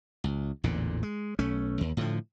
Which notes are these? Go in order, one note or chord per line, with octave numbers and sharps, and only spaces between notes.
C#2
A1 E2 A#2 D3
G#3
B1 A3 C#4
D#2
A2 D3 F3